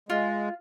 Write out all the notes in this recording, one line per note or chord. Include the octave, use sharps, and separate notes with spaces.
G#3 F4